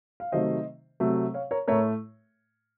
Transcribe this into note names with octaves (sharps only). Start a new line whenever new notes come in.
F5
C3 D#3 F#3 A3 C5 D#5
C3 F#3 A3
C#5 F5
A#4 C#5
A2 A3 A#4 C#5